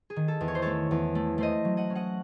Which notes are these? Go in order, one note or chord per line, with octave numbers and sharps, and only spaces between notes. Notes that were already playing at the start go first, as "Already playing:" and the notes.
G#4
D#3
A4
E2
C#5
C5
A3 A4 C#5
E2
A3
A3 C5 D#5
F#3
D#5 F#5
C#4
D#5 F#5